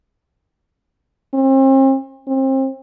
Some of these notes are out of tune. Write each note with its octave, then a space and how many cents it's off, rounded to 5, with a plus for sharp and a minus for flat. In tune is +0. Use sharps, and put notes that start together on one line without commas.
C4 +40
C4 +30